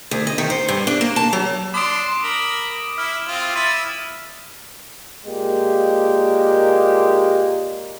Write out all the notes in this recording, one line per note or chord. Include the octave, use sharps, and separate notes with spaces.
D2
D#5
D#3
C5
G2
D4
A#3
A5
F#3
D4 C6 D6 D#6 D7
A#4 B5
E4 F6
C4 F4
E4 E6 A6 D#7
A#2 G#3 A#3 G4